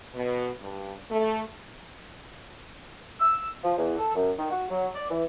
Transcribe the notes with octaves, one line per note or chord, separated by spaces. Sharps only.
B2
G2
A3
E6
F3
E2
A4
F#2
D#3
F#4
F#3
D5
E3